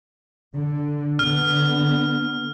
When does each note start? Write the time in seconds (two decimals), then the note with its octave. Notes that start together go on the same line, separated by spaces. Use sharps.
0.54 D3
1.19 D3 B3 F6